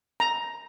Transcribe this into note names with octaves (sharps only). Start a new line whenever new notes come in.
A#5